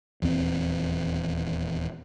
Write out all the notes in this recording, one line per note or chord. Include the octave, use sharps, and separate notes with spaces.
D#1 E2 C4